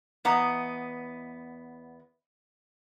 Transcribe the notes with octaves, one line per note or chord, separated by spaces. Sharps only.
E2 B3 D#5 A#5